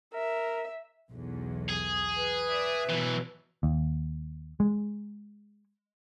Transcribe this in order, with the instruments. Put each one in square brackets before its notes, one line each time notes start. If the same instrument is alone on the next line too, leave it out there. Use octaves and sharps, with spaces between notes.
[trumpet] A#4 [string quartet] E5
[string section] B1 E2
[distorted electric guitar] G#4
[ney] B4
[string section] D5 E5
[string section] B2 [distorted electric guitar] E3 F#3
[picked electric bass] D#2
G#3